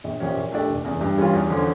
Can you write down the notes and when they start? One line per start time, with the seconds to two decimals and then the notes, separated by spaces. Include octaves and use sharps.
0.04 A#1
0.20 A#2 F3 C#4 G4
0.36 A#2
0.52 A3 D4 G4 D5
0.69 F1
0.85 E2 C#3
1.01 G2
1.17 E3 G3 C#4 F4
1.33 E2
1.50 D3 F3 C#4